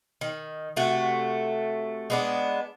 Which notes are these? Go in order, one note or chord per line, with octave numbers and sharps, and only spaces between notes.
D#3
C3 A3 F#4
G#3 B3 D4